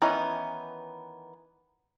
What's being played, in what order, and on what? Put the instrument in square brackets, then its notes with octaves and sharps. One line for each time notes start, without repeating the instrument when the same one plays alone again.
[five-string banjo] D#3 E3 B3 C#4 D#4